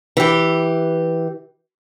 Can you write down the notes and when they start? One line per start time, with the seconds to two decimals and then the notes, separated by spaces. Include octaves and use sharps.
0.17 E3 G4